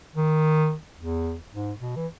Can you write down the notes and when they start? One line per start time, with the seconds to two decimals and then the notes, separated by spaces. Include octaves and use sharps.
0.16 D#3
0.98 E2
1.53 G#2
1.80 B2
1.96 E3